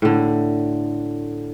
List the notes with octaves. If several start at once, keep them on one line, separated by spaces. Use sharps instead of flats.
A2 D3